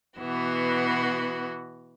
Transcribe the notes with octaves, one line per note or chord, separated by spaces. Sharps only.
B2 E3 B3 F#4